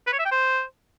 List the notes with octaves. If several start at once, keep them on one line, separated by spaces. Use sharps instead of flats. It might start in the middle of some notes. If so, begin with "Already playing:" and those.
B4
C#5
E5
G5
C5